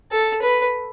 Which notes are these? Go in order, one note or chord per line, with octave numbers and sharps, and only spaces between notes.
A4
B4